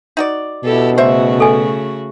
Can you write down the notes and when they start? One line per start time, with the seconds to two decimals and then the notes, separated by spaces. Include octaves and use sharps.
0.17 D#4 F#4 D5
0.64 B2 E4 G4 A4
0.98 C#3 A3 F#4 C5 E5
1.40 A4 G#5